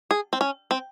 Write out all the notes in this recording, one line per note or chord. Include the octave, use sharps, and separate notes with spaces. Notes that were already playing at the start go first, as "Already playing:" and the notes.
G#4
C4
C#4
C4